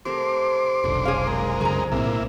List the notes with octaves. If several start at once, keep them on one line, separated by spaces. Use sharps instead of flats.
C3 A3 A#4 C6 D6
F1 B1 D3
C4 C#4 G#4 E5 F5
G#3 C4 A#4
C2 F#2 C#3 G#4 A#5 D6
B1 A2 A#3 C4 E4